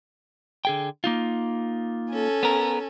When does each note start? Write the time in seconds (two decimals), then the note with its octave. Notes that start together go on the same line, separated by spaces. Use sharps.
0.65 D3 G#4 G5
1.04 A#3 D#4 F4
2.11 C#4 A4
2.43 B3 A#4